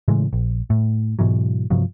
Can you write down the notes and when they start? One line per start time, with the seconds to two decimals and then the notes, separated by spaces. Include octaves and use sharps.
0.08 A2 C#3 E3 G#3
0.33 A#1
0.70 A2
1.19 G#2 B2 E3 F#3
1.70 G2 C3 F3 F#3